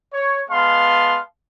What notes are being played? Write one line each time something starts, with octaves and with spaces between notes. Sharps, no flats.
C#5
G#3 B3 F5 A5 C6